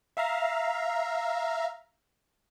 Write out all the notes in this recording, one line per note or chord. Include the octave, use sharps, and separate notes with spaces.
E5 F5 A#5